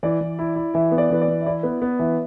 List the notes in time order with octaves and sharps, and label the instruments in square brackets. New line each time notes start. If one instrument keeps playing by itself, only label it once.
[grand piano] E3 [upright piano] D5
[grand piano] E3
E4
E4
[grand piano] E3 [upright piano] E5
[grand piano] B3
[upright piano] D5
[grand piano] E3 [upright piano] B4
[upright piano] D5
[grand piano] E3
[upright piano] E5
[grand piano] E4 [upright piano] D5
[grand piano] B3 [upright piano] B4
[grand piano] B3
[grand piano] E3 [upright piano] E5